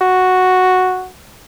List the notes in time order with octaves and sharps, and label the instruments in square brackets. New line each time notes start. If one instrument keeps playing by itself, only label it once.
[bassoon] F#4